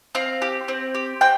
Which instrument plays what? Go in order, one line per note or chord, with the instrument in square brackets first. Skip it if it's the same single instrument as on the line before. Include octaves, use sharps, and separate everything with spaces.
[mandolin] C4 F5
G4
C4
G4
C4 G5